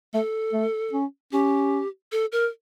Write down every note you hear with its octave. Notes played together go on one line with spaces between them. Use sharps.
A3 A4
A3
C#4
C#4 G4
A4
A#4